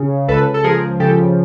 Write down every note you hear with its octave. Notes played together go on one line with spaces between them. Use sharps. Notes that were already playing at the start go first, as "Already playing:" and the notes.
Already playing: C#3
C#2 A4 B4
A4
F3 G#4 A#4
C#3 G4 A4